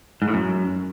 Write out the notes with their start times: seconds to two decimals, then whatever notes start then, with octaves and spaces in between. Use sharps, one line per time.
0.22 G#2
0.28 A2
0.34 F#2